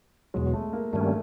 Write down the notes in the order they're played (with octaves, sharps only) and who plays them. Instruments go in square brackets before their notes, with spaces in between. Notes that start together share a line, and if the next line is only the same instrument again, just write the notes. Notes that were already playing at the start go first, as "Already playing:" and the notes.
[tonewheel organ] E2 B2 F#3 [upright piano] G#3
[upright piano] A3
A#3
[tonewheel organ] G2 D#3 G3 A#3 C#4 [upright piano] A3